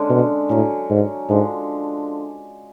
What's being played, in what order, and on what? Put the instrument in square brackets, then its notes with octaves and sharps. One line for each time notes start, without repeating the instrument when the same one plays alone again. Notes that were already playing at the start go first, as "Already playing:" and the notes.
Already playing: [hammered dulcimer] D3 G#3 C#4
[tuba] B2
[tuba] A2 [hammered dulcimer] D3 F#3 C#4
[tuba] G#2
[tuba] G#2 [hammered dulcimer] D3 F3 G#3 D4